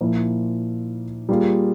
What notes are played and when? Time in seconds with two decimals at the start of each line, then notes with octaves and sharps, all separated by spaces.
0.01 A#2 F3 A#3 E4
1.29 G3 A#3 F4 G#4